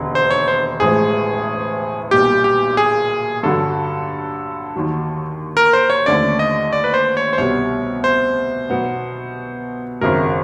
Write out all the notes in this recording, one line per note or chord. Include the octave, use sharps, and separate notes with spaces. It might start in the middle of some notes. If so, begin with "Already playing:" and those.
Already playing: E1 D#2 D3
C5
C#5
C5
A1 A2 F3 G#3 G#4
B1 A#2 G3 G4
G4
G#4
G2 D3 F#3 A4
D#2 D#3 F#3
A#4
C5
C#5
D#2 D3 F3 A3 C#4 D5
D#5
D5
B4
C5
C#5
C5
C2 B2 G3 B3 C#5
C5
B2 F#3 B3
G#1 F#2 C#3 F#3 A#4